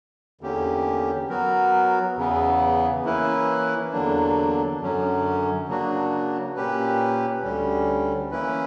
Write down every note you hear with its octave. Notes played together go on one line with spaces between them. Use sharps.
E2 D3 A#3 C#4 G4
F#3 B3 F#4 A#4
E2 C#3 E3 B3
E3 A#3 C#4 E4 B4
E2 D3 F#3 A#3 D4
F#2 D3 F#3 C#4
C#3 F#3 A#3 D4 F#4
A#2 A#3 C#4 G4 B4
D2 D3 G3 C#4
E3 A#3 C#4 E4 B4